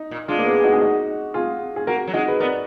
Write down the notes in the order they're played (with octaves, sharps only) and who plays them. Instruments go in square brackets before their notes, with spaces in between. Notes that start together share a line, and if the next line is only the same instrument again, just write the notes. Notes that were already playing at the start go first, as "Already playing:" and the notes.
Already playing: [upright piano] D#4
[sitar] A#2
[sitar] G#3 [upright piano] D4 F4
[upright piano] A#3
B3
G#4
D#4 F#4
G#4
D#4 F#4
F4 G#4
G#4
[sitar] A#3 [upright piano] F#4 A#4
[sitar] F#3
[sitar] G#3 [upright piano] D#4 F#4
[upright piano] B4
[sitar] B3 [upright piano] A#4 D5